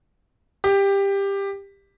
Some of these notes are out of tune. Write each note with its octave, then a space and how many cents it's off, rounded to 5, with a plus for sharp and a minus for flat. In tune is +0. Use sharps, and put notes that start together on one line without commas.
G4 +15